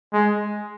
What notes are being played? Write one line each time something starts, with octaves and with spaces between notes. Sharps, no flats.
G#3